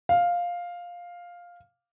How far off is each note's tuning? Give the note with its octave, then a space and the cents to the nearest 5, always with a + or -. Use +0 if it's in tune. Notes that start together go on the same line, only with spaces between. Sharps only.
F5 +5